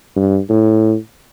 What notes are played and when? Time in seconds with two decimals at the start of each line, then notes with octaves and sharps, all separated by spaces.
0.17 G2
0.50 A2